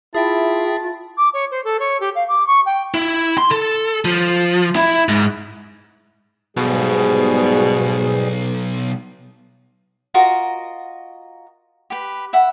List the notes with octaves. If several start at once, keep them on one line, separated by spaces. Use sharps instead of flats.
E4 F4 G#4 E5 G5 A5
D6
C#5
C5
A4
C#5
G4
F5
D6
C#6
G5
E4
C6
A4
F3
E4
G#2
B1 G#2 B2 G3 G#4
F4 F#4 A#4 D#5
G4 B4
E5 F#5 B5